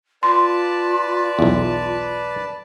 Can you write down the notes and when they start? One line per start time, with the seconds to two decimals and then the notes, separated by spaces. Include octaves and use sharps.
0.23 F4 B4 D5 A5 C6
1.39 B1 E2